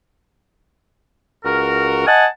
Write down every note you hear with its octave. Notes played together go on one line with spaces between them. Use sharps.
C#2 F#4 A#4
D#5 F#5 G#5 A5